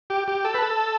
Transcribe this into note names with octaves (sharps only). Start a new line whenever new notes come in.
G4
G4
A4
B4
A4